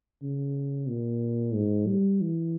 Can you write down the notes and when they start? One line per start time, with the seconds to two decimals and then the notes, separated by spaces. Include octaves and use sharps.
0.22 C#3
0.89 A#2
1.54 G#2
1.87 G3
2.21 E3